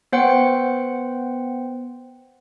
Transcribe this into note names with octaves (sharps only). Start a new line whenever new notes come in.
B3 C5 F#5 G5 C#7